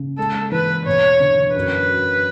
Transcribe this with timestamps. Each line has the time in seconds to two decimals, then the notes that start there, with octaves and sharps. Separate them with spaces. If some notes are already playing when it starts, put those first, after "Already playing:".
Already playing: C#3
0.18 G#3 A4
0.51 E3 B4
0.86 E1 C#5
1.20 D3
1.55 F#2 B4
1.89 F#3